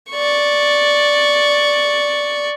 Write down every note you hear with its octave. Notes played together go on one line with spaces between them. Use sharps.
D5 C#6